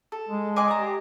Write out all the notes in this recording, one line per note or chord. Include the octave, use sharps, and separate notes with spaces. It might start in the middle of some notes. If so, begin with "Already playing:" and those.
A4
G#3
G#4 D#5 G#5 C6 D6
D5 A5 A#5
G4